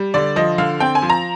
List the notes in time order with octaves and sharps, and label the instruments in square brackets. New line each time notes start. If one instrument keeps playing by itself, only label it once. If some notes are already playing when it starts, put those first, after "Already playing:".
Already playing: [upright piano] G3
D3 D5
F3 D#5
D3 F5
C4 G5
G#5
F3
A#5